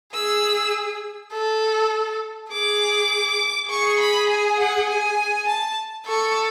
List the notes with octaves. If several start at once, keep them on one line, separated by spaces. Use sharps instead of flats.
G#4 E6
A4
G#4 D6
G#4 C#6
B5
G#5
F#5
G#5
A5
A4 C#6